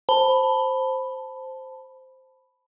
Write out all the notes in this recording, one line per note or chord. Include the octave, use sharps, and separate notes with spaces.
C5 A5 B5